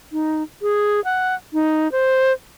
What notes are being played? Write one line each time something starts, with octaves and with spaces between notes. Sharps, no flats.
D#4
G#4
F#5
D#4
C5